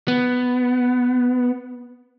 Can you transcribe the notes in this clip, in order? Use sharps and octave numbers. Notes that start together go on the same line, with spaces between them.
B3